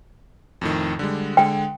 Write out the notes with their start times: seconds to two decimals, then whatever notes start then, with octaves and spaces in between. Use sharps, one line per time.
0.61 F2 A2 D#3
0.99 D3 G3 G#3
1.37 D3 G#3 G5